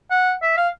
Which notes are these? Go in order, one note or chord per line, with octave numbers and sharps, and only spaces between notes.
F#5
E5
F5